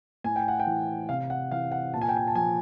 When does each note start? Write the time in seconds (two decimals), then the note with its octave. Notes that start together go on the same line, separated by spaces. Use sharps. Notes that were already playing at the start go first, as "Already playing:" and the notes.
0.24 A2 G#5
0.36 G5
0.48 F#5
0.60 G5
0.67 E3
1.09 C3 F5
1.30 F#5
1.51 E3 F5
1.72 F#5
1.94 A#2 A5
2.02 G#5
2.09 G5
2.17 G#5
2.28 A5
2.35 F3 G#5